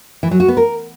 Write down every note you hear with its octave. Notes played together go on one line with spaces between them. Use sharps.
E3
F#3
F#4
B3
A#4